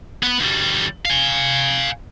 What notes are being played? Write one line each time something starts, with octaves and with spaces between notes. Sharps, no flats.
B3 B4
D2 G3
F5 G#5